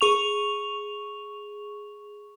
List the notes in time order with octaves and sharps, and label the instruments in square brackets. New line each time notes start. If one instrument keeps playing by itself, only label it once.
[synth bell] G#4 C#6 F7